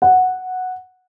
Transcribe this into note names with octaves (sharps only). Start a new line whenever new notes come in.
F#5